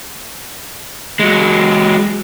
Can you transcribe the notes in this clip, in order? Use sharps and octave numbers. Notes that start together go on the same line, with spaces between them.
F#3 G#3